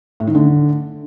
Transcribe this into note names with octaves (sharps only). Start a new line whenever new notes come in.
A2
D#3
D3